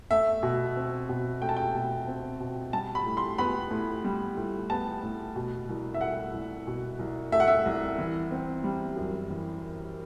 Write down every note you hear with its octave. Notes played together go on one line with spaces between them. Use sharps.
A3 E5
B2
C4
B2
A3 G5
A5
G5
B2
C4
B2
G3 A5
B5
A2
C6
B3 B5
A2
G3
A2
B3 A5
A2
B2
C2
E5
A3 F#5
C2
B2
C2
A3 E5
F#5
E5
C2
E3
C4
G3
F#2
E3